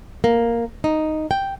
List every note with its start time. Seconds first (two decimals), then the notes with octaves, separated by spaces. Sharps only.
0.24 A#3
0.84 D#4
1.31 G5